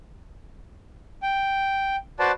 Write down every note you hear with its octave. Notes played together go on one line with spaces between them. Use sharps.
G5
F#4 B4 C5 D5 A5